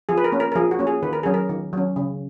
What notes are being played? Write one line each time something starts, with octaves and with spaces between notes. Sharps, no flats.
F3 G#4
B4
A#4
A#3 C#4
A#4
A#4
F3 G#4
F#4
A#3 C#4
G#4
D#3 B4
A#4
F#3 C#4 G#4
A#4
D#3
F#3 C#4
C#3